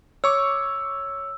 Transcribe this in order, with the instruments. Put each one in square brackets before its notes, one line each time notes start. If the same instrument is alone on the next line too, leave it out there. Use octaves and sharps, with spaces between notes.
[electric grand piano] C#5 C#6 D6 [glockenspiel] E6